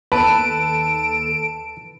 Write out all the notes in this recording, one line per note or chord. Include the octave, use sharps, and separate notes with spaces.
D#2 A4 B4 A5 D7 E7